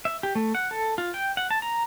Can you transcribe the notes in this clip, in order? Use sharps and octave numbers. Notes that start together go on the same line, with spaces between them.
E5
G4
A3
F#5
A4
F4
G5
F#5
A5
A#5